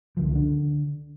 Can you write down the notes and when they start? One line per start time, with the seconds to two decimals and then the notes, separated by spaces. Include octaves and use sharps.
0.17 C#2 D3 F3
0.34 D3 D4